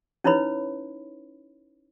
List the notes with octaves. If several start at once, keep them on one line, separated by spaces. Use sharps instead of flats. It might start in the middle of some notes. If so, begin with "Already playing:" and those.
C#4 D#4 E4 B4 C#5 B5